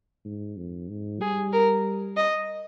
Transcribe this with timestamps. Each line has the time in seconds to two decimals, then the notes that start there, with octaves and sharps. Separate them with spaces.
0.25 G#2
0.57 F2
0.89 G#2
1.21 G3 G#4
1.53 A#4
2.17 D#5